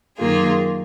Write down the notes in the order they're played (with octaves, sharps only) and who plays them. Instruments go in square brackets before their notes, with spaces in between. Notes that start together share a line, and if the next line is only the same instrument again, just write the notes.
[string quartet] F#2 D#3 A#3 F4 G#4